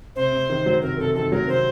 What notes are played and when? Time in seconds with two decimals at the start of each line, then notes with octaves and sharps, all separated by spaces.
0.16 C3 C5
0.32 C3
0.49 D#3
0.66 F#3
0.82 C3 A#4
0.99 C3 A4
1.15 D#3 A4
1.31 F#3 A#4
1.48 C3 C5